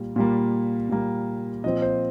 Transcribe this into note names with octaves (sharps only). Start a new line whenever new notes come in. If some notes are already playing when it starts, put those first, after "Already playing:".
Already playing: A#2 G3 A#3
A#2 G3 A#3
A#2 G3 A#3
A#2 F3 C4 D#5
C5